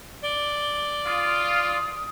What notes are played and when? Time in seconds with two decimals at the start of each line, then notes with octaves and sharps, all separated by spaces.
0.23 D5 G7
1.06 F4 D#6